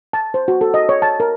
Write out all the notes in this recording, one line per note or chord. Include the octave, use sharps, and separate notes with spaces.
A5
C5
F#4
A4
D#5
C#5
A5
A#4